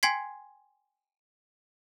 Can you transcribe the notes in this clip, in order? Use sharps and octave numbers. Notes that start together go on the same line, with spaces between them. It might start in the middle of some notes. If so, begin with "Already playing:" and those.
G5 G#5 C6 G#6 B6 C7